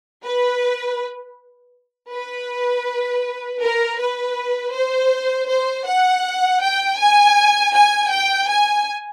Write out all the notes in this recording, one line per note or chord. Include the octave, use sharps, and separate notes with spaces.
B4
B4
A#4
B4
C5
C5
F#5
G5
G#5
G#5
G5
G#5